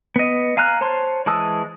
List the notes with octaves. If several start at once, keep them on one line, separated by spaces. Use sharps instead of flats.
B3 D#5
F5 G#5 A#5 F6 F#6
C5 C#5 A5 C6
E3 G#3 A5 D#6 E6